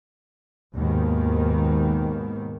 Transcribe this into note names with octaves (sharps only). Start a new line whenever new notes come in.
D#2 G#2 B2 D#3